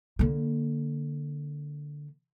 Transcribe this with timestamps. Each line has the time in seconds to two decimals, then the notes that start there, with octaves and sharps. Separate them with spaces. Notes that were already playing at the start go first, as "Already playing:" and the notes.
0.19 D3 A#3